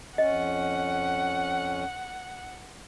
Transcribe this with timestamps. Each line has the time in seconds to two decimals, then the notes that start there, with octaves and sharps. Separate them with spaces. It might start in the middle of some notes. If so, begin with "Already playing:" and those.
0.18 F2 C#4 D#5 F#5